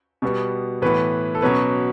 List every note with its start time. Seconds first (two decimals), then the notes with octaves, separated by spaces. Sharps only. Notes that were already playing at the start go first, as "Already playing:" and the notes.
0.22 B2 G3 B3
0.82 A2 E3 B3 B4
1.35 A4
1.42 B2 F#3 C#4 B4